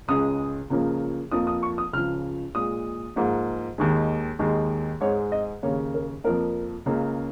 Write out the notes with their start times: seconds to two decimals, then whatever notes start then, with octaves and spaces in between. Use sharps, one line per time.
0.08 C#2 C#3 G#3 D#6
0.70 C#2 C#3 F3 A#3
1.32 F2 F3 A#3 D#6
1.47 D#6
1.63 C#6
1.78 D#6
1.93 C#2 C#3 F3 F6
2.55 A#2 G#3 D#6
3.16 G#2 F3 A#3
3.78 D#2 D#3 G#3
4.39 D#2 D#3 G#3
5.01 G#2 G#3 C#5
5.32 D#5
5.63 D#2 C#3 A#3 C#5
5.94 A#4
6.24 F2 F3 A#3 A#4
6.86 C#2 C#3 A#3